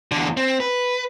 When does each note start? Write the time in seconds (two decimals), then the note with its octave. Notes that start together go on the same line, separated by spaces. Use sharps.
0.12 E2 D3
0.37 C4
0.60 B4